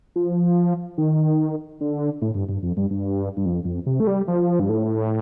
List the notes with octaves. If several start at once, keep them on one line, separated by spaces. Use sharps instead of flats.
F3
D#3
D3
A2
G2
G2
F2
G2
G2
G2
F2
F2
C3
A3
G3
F3
G2
A2